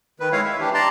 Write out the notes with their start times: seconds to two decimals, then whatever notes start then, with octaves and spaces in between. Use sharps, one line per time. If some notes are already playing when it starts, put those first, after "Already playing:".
0.20 D#3 B4
0.32 G#3 E4 C#5 F5
0.45 E5
0.60 E3 D4 G4
0.74 D5 A5 A#5 C6